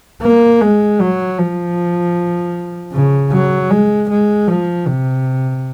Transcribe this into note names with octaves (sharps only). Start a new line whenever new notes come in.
A#3
G#3
F#3
F3
C#3
F#3
G#3
G#3
F3
C3